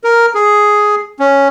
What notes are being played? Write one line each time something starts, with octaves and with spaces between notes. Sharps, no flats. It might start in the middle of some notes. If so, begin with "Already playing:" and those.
A#4
G#4
C#4